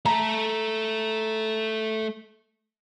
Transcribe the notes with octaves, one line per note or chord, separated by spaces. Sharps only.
A3 A4 A#5